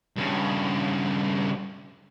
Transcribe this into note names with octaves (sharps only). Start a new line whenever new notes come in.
G2 C#3